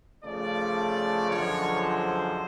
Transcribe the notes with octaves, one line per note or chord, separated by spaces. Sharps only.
C#3 F3 A3 D5
F#2 D3 F3 G#3 C#5
C5